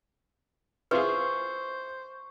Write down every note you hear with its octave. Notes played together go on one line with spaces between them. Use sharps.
E4 F4 G#4 B4 C5 C#6